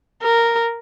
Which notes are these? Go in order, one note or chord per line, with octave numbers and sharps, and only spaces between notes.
A#4